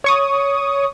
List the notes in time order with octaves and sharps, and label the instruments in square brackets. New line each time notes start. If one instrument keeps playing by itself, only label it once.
[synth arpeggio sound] C#5 C#6 D#6